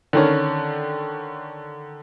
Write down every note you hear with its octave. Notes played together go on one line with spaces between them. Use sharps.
D3 D#3 C#4